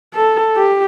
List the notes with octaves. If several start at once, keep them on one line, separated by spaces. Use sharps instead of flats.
A4
G4